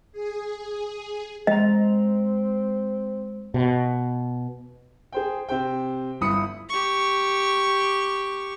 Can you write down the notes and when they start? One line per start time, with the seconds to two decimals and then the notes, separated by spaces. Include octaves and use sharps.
0.12 G#4
1.47 G#3 C4 D#5 A#5
3.54 B2
5.13 G#4 C5 G5
5.49 C3 C5 G5
6.21 G1 E4 B5 D#6 C#7
6.69 G4 C#6